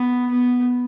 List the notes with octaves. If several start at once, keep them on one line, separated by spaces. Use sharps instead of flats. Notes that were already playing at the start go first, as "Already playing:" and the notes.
Already playing: B3
B3